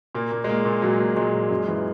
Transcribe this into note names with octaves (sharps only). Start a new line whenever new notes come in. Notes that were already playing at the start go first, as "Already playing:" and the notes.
A#2 A#3
A#2
G#3
A#2 A#3
A#2
A#2 F#3
A#2
A#2 G#3
A#2
F#2
E3